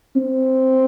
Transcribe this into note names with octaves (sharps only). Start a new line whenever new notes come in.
C4